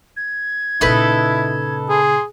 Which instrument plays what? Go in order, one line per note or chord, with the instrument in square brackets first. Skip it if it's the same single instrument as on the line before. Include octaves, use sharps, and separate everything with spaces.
[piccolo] G#6
[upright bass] A#2 C#3 [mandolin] D#4 A4 B4 [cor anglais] E4
[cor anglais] G#4 [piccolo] C6